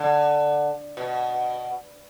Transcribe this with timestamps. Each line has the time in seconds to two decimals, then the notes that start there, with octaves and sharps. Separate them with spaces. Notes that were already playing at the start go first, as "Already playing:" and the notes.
Already playing: D3
0.97 B2